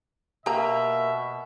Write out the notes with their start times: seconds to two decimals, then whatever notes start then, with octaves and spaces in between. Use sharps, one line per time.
0.46 B2 A#3 G4 E5 A#5